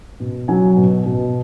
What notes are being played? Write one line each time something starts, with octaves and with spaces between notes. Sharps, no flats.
B2
F#3 G#5
B2
B2